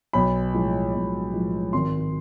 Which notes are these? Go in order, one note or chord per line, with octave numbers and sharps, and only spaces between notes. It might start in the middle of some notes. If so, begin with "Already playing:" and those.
B1 B5
A2 F3 G#3
B1
A2 F3 G#3
G#1 C6